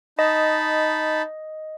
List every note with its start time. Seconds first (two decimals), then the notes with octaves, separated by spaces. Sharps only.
0.19 D#4 D#5 A5 B5